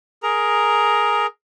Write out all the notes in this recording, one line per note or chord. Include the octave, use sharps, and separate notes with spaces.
G#4 A#4 A#5